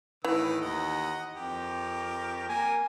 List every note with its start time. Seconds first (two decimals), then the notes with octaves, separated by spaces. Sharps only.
0.24 A2 D#3 E3 B4 E6
0.61 D#2 D#5 F#5
1.35 F2 G4 A#4
2.49 A#3 G#5